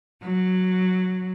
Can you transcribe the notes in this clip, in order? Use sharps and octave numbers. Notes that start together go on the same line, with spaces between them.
F#3